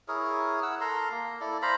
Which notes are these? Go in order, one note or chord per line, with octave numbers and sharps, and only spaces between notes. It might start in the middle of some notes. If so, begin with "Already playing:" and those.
E4 G#4 A#4 C#5
F#5 E6
A4 A#4 A#5 C6
A#3
E4 A4 D5
C5 F5 A#5 B5